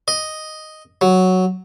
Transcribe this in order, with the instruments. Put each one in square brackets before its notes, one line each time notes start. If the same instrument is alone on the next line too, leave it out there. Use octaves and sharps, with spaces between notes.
[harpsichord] D#5
F#3